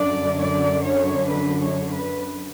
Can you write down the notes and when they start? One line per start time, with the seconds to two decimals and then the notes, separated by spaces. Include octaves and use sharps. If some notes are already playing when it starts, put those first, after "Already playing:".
Already playing: F#2 D3 D5
0.39 D5
0.86 C#5
1.32 B4
1.63 C#5
1.94 B4